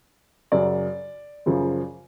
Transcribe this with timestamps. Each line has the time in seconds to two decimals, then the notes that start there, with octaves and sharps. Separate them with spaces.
0.52 F#2 C#3 F#3 D5
1.46 F#2 C#3 F3